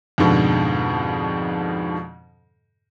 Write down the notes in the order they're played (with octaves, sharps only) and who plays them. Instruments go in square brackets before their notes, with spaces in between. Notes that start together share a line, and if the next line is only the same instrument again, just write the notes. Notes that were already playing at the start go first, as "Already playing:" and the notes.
[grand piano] F2 G#2 B2 D3